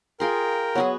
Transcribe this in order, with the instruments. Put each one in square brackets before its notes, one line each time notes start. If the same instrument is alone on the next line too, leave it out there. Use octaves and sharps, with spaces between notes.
[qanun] F4 G#4 C6 [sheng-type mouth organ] A#4 G5
[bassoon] F#3 [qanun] B3 F#4 G#4